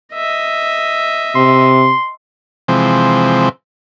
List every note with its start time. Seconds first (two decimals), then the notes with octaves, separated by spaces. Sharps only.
0.14 D#5 E5
1.36 C3 C6
2.68 C3 E3 F3 G#3 C4